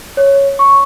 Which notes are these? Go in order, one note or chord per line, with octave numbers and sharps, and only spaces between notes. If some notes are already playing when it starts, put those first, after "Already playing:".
C#5
C#6